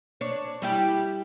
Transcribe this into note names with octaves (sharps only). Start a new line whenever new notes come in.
D4 C#5
G3 E4 G4